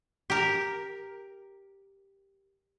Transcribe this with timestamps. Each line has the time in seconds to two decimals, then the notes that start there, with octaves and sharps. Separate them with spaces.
0.30 G4 A#4